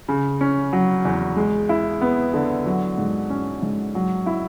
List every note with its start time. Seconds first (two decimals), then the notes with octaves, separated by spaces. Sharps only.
0.08 C#3
0.41 C#4
0.73 F#3
1.05 E2
1.36 G#3
1.69 E4
2.01 B3
2.34 D3
2.66 F#3
2.98 G#2
3.30 C#4
3.62 G#2
3.95 F#3
4.26 E4